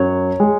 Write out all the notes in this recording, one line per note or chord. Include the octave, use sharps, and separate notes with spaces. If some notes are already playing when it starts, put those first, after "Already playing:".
Already playing: F#2 F#3 C#5
G#3